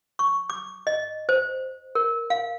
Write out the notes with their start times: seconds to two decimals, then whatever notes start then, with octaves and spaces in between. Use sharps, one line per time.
0.19 C#6
0.50 D6
0.87 D#5
1.29 C5
1.95 A#4
2.30 F5